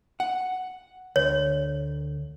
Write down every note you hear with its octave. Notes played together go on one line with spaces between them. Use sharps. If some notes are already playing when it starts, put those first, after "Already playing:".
F#5
D2 C#5